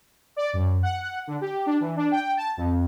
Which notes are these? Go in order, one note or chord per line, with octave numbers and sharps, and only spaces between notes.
D5
F#2
F#5
D3
G4
D4
E3
D4
G5
A5
F2